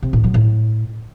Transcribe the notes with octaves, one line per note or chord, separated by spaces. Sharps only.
C3
A2
F#3
A2